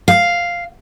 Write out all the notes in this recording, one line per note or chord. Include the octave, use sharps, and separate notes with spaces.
F5